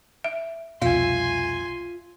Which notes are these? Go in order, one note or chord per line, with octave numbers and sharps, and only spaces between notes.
E5
C2 F2 B2 F4 E5 F5 G#5 C6